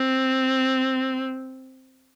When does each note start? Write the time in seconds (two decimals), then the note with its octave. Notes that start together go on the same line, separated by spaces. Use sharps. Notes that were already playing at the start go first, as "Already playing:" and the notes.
Already playing: C4